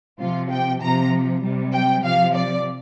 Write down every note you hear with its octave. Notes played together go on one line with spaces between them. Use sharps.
C3 F3 F4
G5
C3 F3 A#5
C3 G3
G5
C3 F3 F5
D5